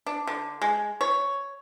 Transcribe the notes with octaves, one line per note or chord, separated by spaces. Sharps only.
D4
D3
G#3
C#5